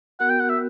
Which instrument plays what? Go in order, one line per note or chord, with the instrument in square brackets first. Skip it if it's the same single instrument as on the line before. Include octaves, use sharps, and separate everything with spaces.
[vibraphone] B3 F#4 A#4 [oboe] F#5
[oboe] G5
F#5
E5